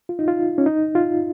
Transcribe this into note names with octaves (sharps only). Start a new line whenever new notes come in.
F4
D#4
F4
C#4
D#4
F4